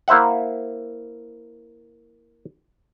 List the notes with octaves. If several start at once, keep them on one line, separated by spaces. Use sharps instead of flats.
A#3 E4 C5 E5 F#5